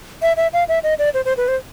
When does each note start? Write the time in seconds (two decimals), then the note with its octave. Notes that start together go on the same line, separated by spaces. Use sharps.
0.22 E5
0.37 E5
0.53 F5
0.68 E5
0.83 D#5
0.99 D5
1.14 C5
1.25 C5
1.37 B4
1.48 C5